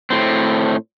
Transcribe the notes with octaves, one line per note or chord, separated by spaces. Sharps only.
A2 C4